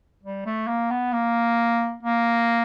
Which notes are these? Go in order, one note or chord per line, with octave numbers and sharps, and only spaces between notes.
G3
A3
A#3
B3
A#3
A#3